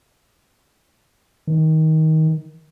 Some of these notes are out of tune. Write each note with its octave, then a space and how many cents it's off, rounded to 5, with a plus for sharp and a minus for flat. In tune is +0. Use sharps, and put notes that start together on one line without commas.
D#3 +20